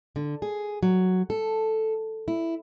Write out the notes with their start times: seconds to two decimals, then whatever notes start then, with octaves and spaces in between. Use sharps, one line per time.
0.16 D3
0.42 G#4
0.83 F#3
1.30 A4
2.28 E4